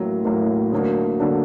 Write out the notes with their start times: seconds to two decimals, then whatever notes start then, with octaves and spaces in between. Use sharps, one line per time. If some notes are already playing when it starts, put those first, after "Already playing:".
Already playing: A1 A2 F#3 A#3
0.25 A1 A2 F#3 A#3
0.72 D2 D3 F#3 A#3 D4
1.20 D3 F#3 A#3 D4